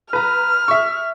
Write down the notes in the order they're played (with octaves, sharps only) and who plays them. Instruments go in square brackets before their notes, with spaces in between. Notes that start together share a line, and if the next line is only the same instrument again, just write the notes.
[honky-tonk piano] B4 A#5 [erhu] F6
[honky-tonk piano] E5 C#6